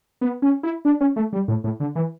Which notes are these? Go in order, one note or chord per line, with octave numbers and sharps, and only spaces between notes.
B3
C#4
E4
D4
C#4
A3
G3
A2
A2
D3
E3